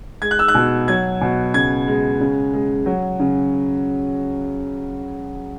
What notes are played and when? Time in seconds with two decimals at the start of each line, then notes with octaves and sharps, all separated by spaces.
0.22 G#3 G#6
0.31 F#6
0.39 E6
0.48 F#6
0.54 B2
0.88 F#3 G#6
1.21 B2
1.54 C#3 G#6
1.88 G#3
2.20 C#3
2.53 G#3
2.86 F#3
3.20 C#3